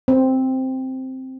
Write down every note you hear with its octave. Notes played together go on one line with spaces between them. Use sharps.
C4